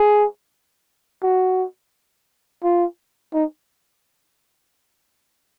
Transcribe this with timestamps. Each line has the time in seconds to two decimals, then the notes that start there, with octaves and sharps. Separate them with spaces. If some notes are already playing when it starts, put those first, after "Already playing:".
Already playing: G#4
1.23 F#4
2.64 F4
3.34 D#4